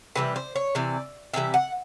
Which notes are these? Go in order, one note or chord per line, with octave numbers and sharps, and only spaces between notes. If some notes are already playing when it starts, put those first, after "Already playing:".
C3 E3 G3 B4
C5
C#5
C3 E3 D5
C3 E3 G3 E5
F#5